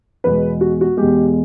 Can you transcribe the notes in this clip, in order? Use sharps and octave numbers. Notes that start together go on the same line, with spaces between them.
E2 B2 G#3 B4
F#4
F#4
E2 B2 G#3 G4